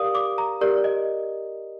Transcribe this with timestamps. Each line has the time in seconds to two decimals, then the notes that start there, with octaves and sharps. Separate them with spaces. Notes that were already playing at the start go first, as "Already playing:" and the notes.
Already playing: G4 A#4 D5 F5 D#6
0.15 D6
0.38 A#5
0.61 G4 A#4 D5
0.84 D#5